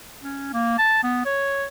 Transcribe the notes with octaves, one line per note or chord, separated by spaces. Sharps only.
C#4
A#3
A5
B3
C#5